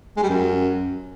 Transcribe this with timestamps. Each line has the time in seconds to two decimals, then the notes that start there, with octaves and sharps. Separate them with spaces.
0.17 G#3
0.23 G3
0.29 F#2